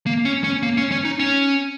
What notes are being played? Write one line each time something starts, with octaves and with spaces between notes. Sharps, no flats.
A#3
C#4
C#4
A#3
C#4
C#4
D#4
C#4